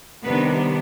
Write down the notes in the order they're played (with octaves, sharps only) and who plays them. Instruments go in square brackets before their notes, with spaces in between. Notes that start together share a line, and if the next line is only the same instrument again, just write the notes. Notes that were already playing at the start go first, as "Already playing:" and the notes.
[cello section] C3 D#3 G3 B3 D4 B4